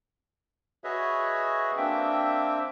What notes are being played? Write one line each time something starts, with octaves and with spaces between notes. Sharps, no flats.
F#4 G#4 B4 C#5 D#5 E5
A#3 C4 D4 E5 G5